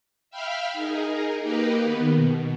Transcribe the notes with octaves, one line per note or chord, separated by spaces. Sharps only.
E5 F5 G5 B5 F6
D#4 G#4 A#4
A#3 D#4 G4 A#4 B4
D#3 B3
B2